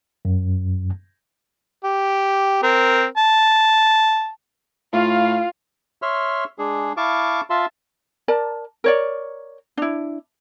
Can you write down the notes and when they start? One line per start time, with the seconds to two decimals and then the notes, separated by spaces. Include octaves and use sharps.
0.25 F#2
1.84 G4
2.63 C4 A#4
3.18 A5
4.93 A2 F4 F5
6.02 C#5 E5 C6 F6
6.59 G#3 D4 G#4
6.97 E4 F5 A5 C#6 D6
7.50 F4 E5 A5 C6
8.28 A#4 D5 A5
8.84 A#4 C#5 D5
9.77 D4 E4